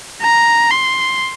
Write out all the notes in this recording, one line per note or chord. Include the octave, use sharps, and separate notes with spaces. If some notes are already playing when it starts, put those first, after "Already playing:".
A#5
C6